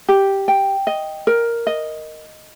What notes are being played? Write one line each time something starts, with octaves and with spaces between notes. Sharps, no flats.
G4
G5
D#5
A#4
D#5